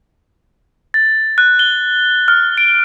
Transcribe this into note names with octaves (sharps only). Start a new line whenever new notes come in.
A6
F#6
G7
F6
D7